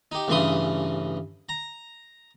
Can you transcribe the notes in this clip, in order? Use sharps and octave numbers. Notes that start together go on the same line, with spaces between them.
D#4 G4
A1 G2 C#3 E3 C6 D#6
A#5